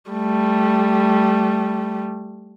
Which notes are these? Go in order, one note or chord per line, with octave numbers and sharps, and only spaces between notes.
G3 A3